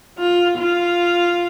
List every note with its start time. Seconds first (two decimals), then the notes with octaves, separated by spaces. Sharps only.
0.18 F4
0.58 F4